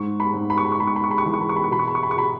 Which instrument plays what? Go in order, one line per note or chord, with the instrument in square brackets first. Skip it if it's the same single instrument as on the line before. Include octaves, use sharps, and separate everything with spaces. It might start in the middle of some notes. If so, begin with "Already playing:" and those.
Already playing: [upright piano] G#2 C#6
B5
G#2
B5
C#6
B5
C#6
G#2 B5
C#6
B5
C#6
B5
C#6
E3 B5
C#6
B5
C#6
B5
C#6
B2 B5
C#6
B5
C#6
B5
C#6
B2 B5